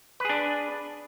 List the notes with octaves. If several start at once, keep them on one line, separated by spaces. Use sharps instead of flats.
D4 G#4 B4